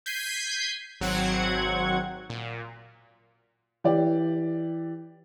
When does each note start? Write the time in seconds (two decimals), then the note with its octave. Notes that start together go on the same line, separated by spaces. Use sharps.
0.06 G6 G#6 B6 C7 D#7
1.01 G#1 F#3 C4 F#5 G#6
2.30 A#2
3.84 E3 G4 D5